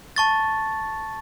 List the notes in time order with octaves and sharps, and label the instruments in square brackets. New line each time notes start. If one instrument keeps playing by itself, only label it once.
[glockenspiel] A5 C#6 A6